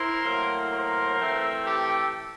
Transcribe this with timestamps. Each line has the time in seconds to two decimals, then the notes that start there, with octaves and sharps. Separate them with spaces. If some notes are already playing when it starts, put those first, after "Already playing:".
Already playing: E4 A#4 C5
0.25 A2 F#3 A#3
0.72 A#4 C5
1.19 E3 A3 C4
1.65 G4 A4